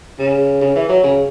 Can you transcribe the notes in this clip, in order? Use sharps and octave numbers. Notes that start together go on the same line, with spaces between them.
C#3
C#3
E3
F#3
C#3